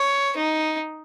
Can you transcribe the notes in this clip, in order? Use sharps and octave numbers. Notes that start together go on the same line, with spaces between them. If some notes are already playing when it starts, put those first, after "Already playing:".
Already playing: C#5
D#4